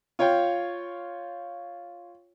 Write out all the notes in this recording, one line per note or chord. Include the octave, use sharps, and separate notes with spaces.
F4 C#5 F5 G5